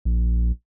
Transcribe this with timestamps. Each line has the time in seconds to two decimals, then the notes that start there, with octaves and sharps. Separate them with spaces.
0.05 A#1